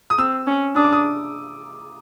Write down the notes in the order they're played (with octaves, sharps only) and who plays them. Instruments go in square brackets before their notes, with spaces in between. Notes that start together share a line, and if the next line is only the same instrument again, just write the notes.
[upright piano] D#6
[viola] C4 [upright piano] E6
[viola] C#4
[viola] D4 [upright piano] D#6
[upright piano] D6
D#6